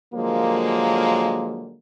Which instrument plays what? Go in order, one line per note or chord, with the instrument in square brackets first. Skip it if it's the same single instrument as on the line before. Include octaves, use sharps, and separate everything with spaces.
[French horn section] D3 F3 F#3 G#3 A#3